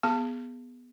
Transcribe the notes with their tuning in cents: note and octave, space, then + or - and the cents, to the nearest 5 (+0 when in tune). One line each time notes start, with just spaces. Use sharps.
B3 +0 G#4 -5 A5 +20